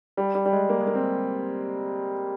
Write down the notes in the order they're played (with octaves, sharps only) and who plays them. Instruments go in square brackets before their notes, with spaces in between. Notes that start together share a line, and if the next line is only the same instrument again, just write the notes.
[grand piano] G3
G3
G3
G#3
A#3
G#3
A#3
C4